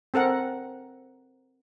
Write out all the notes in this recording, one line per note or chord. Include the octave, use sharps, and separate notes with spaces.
C4 A4 A#4 F#5